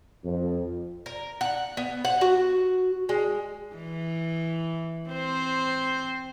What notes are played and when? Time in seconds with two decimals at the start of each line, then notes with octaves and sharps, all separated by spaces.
0.25 F2
1.06 A#4
1.41 F#5
1.77 B3
2.05 F#5
2.21 F#4
3.09 G#3
3.76 E3
5.10 C4 C5